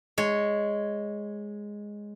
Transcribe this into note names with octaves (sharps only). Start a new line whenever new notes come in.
G#3 C#5